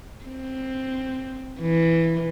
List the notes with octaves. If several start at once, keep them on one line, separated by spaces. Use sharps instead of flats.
C4
E3